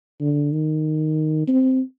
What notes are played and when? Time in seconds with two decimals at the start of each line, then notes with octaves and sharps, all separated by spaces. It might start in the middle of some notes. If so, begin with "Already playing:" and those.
0.21 D3
0.52 D#3
1.48 C4